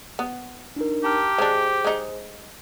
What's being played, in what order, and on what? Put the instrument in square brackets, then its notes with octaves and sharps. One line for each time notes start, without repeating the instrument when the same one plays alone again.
[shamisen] B3
[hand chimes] D4 D#4 A#4
[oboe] G4 [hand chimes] A5 A#5 F6
[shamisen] G#3 D4 [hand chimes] G#4 C5
[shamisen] G#3 D#4